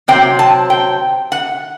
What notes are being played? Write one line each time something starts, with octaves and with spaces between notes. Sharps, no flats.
C3 F#3 C4 G5
A5
G5
F#5